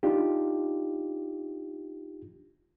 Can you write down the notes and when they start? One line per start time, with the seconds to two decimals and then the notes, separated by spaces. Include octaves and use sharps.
0.03 D4 D#4 F4 G4